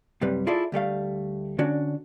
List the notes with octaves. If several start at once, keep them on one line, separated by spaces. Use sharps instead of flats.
C2 F#2 C3 G3 B4
E4 F4 G#4 A4 D5 E5
D2 G3 A3 F5
D3 C#4 D4 F#4